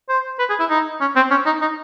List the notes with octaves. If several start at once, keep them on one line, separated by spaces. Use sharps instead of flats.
C5
B4
G#4
E4
D#4
C#4
C4
C#4
D#4
D#4